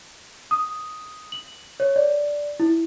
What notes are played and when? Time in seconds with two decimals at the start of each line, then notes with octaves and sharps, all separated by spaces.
0.51 D#6
1.32 F#7
1.80 C#5
1.96 D5
2.60 E4